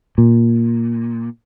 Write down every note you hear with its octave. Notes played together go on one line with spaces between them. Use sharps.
A#2